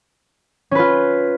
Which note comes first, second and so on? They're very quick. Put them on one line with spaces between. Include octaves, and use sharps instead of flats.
C#4 B4 F4